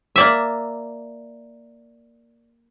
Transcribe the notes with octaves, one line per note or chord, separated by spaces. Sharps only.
A#3 D5 E5